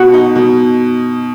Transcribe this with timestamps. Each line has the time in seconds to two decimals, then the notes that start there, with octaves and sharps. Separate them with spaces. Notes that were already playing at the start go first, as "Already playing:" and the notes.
Already playing: B2 F#4 F#5
0.13 D#4
0.35 B2